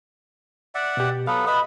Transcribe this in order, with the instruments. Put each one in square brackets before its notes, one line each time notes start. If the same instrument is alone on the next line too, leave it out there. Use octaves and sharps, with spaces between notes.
[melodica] D5 E5 F#5
[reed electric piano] B2 G4
[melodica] F#3 A4 B4 [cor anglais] B3 [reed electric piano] F5
[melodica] B4 E5 [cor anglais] D#5 [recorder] B5